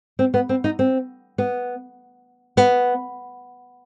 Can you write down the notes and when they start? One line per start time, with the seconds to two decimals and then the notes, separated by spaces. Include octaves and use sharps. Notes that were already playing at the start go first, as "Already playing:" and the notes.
0.19 C4
0.34 B3
0.49 C4
0.64 D#4
0.79 C4
1.38 B3
2.57 B3